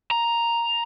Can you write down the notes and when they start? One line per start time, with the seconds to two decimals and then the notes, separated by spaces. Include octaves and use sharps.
0.11 A#5